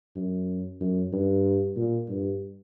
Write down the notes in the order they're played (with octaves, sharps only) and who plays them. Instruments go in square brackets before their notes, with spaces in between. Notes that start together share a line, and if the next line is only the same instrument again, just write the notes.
[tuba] F#2
F#2
G2
A#2
G2